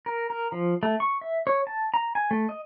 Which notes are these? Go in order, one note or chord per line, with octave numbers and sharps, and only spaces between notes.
A#4
A#4
F3
A3
C#6
E5
C#5
A5
A#5
G#5
A3
D#5